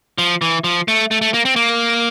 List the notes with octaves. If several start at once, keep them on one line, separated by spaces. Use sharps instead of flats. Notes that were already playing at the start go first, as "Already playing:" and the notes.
F3
E3
F3
A3
A3
A3
A#3
C4
A#3